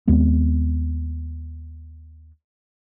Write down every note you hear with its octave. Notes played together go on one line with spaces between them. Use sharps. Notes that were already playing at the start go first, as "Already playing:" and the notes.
D#2 G#3 B3 C4